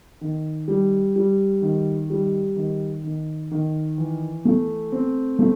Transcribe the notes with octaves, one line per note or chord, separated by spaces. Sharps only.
D#3
G3
G3
D#3
G3
D#3
D#3
D#3
E3
A3
C4
A3